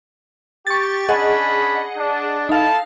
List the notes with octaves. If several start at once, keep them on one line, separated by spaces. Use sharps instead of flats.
G4 C#6 A6
C#4 D4 G#4 D#5 F#5 B5
D4
D#4 E4 A4 F5 A5